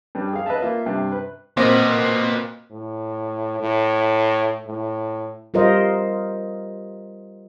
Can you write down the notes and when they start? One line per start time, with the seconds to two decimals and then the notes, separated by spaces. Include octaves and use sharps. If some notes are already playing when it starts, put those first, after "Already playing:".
0.15 G2 G3
0.33 G#4 F5
0.46 B4 D#5 E5 A5
0.61 A#3 F4 E5
0.86 G2 C3
1.12 B4
1.57 A#2 C4 B4 D#5
2.71 A2
3.60 A2
4.67 A2
5.54 G3 F4 A#4 C5 D#5